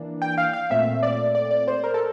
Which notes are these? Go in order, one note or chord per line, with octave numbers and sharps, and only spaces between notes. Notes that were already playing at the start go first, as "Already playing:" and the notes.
Already playing: E3 A#3 D4
G5
F5
F5
A#2 A3 C4 E5
D5
D5
D5
C5
A#4
A4